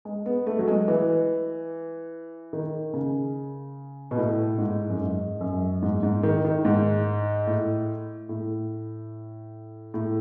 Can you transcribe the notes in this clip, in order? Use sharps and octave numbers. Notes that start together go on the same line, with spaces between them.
G#3
B3
A3
F#3
G#3
E3
D#3
C#3
B2
A2
G#2
F#2
G#2
F#2
G#2
G#2
D#3
D#3
G#2
A2
A2
A2